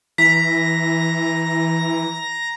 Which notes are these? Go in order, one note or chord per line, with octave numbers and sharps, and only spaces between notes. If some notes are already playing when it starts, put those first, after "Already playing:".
E3 A#5 B6